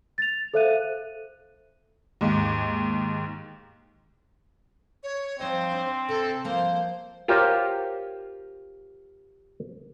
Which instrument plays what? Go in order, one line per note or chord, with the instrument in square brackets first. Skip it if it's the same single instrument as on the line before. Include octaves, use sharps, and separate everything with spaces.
[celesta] A6 F7
A4 C5 E5 F5 F#6 D#7
[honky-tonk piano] D#2 G#2
[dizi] C#5
[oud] F3 D#4 D#5 [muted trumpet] C4 [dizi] C5
[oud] D4
[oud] C3 [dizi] A4
[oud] F3 A#3 [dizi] C5
[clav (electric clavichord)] F4 G4 A#4 C5 C#5